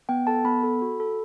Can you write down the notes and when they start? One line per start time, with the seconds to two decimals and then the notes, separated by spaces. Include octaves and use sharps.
0.09 B3 G5
0.27 A4 A5
0.45 B3 B5
0.63 A4
0.82 F#4
1.00 A4